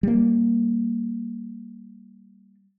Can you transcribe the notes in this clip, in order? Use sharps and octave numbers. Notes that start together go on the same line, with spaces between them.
G3 A#3